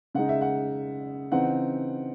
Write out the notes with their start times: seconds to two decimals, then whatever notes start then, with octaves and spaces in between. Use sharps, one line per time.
0.15 C#3 G#3 D#4 F#5
0.29 E5
0.41 F#5
1.32 C#3 E3 C4 D#4 F#5